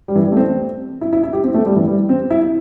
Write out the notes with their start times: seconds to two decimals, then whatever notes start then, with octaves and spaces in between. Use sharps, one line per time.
0.08 G3
0.16 E3
0.27 G3
0.32 A3
0.37 C4
0.47 C4
1.01 E4
1.13 E4
1.23 E4
1.33 G4
1.44 C4
1.54 A3
1.66 G3
1.76 E3
1.87 G3
2.09 C4
2.30 E4